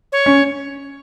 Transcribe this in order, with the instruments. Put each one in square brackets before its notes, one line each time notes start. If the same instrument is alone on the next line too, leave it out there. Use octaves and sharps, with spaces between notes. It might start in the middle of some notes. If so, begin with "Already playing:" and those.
[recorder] C#5
[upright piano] C#4